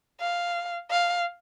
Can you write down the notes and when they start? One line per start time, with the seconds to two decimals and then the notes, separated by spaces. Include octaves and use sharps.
0.21 F5
0.91 F5